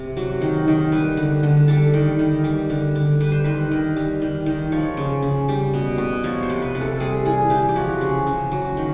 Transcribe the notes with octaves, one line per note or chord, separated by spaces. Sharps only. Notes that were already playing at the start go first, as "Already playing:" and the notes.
Already playing: C3
F#3
D#3
D#3
G3 B4
D3
D3
G3 A4
D#3
D#3
G3
D3
D3
G3 B4
C5
D#3 B4
D#3
G3
D#3
D#3
F3 C#5
C#3
C#3
G3
B2
B2
F3 C#5
C5
C3
B4
C3
A4
G3 G#4
E3 G#4
E3 G4
G4
F3 F#4
C#3
C#3
F#3
D#3